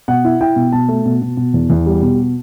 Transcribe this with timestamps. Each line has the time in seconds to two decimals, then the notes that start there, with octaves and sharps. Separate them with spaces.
0.08 B2 F#5
0.25 E4
0.41 E4 G5
0.56 B2
0.72 B2 A5
0.89 A3
1.05 B2
1.22 B2
1.37 B2
1.54 E2
1.70 E2
1.86 G3
2.02 B2